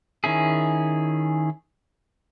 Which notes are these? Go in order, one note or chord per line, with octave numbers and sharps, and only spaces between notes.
D#3 C#4 E4 G#4